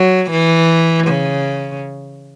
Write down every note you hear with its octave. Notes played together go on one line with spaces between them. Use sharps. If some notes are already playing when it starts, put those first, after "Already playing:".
Already playing: F#3
E3
C#3